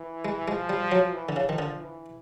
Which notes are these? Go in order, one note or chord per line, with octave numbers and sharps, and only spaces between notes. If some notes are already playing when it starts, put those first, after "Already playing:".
Already playing: E3
G#3
F3 G#3
G3
F#3
E3
D3
C#3
D#3 F3
D3
E3